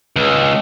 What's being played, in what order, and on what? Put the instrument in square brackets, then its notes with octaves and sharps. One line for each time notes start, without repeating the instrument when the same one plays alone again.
[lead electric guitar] C#2